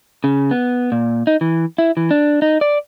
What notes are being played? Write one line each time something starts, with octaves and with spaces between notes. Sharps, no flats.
C#3
B3
A#2
D#4
E3
E4
E3
D4
D#4
D5